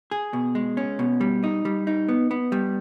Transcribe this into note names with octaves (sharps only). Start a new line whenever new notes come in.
G#4
B2
G#3
C#4
B2
G3
D#4
G3
D#4
B3
B3
G3